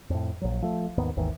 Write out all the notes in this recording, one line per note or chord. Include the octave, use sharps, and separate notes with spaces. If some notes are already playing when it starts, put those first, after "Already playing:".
F2 A2
A#1 F#3
F3 A3
D#2 G#2 D#3 B3
G#1 D#2 D#3 E3